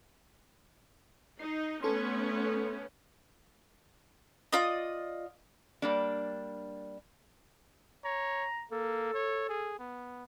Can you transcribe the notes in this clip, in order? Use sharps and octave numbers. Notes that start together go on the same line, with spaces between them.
D#4 C7
A3 B3 C#4 A4 C6
F4 D5 D#5
G3 A#3 D4
C#5 A#5
A#3 A4
C#5
G#4
B3